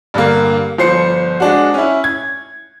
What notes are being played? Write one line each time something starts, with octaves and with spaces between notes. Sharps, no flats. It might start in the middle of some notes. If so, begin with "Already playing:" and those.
G2 D3 G3 A#3
G1 F3 C5 C7 C#7
G#3 D4 F#4
C#4 E4
G#6